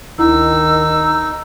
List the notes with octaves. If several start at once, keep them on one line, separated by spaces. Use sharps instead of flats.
D2 D#3 D#4 E4 E6